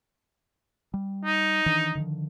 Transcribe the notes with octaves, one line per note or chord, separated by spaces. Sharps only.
G3
D#4
D#3 E3 D4
D3 D#3 F3